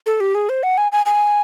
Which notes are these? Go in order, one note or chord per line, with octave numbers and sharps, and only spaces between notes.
A4
G4
G#4
C5
F#5
G#5
G#5
G#5